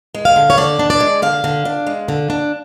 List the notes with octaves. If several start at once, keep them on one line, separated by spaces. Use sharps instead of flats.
G#3
F5
D3
C#5
D3 D5
D4
D5
G#3
D3 F5
D3
D4
G#3
D3
D4